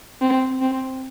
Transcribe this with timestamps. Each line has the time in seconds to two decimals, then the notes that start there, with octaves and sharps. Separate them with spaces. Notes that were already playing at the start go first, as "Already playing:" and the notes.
0.21 C4
0.61 C4